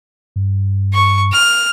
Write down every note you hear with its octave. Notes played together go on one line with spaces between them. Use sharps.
G2
C#6
F6